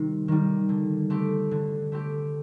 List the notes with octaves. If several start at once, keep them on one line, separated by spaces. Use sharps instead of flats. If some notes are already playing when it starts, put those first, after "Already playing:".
Already playing: C3 D#3 G3
D#3 G3
D3
A3 C4 G4
D3
A3 C4 G4